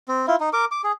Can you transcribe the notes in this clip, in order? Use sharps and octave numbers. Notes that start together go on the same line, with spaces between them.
C4
E4 F4
D#4
A#4 D6
D6
G#4